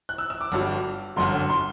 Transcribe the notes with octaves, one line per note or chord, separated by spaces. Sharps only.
F#6
E6
E6
D6
G1 G2 F#3
G1 F#2 D3 C6
C6